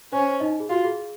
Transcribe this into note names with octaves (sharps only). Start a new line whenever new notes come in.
C#4 C5
D#4 D#5
G#4
F4 F#4
G#4